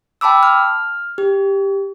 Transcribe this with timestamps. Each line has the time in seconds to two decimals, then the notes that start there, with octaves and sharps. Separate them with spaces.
0.21 G5 A5 B5 D6 E6
0.43 F6
1.18 G4